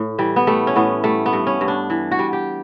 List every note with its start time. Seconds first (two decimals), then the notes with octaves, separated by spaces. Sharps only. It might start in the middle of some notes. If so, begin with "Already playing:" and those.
Already playing: A2
0.18 E3 G3
0.36 B3
0.47 G3 A3
0.67 C#4
0.76 A2 B3
1.04 G3 A3
1.26 B3
1.33 G2
1.47 C#4
1.61 G2
1.68 D4
1.90 E3
2.11 F#4
2.19 G3
2.33 G4